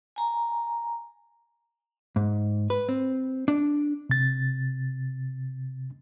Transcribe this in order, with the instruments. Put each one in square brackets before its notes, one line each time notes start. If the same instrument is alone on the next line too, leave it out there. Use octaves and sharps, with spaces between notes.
[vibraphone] G#5 A#5
[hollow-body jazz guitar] G#2
B4
C4
D4
[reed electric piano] C3 A6